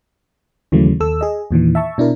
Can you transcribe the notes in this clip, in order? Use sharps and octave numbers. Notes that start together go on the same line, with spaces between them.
D#2 C#3 E3 F#3 A3
D#2 A4 E6
G#4 D#5
E2 A#2 D#3 E3
E5 A5 C#6
B2 D4 E4 A#4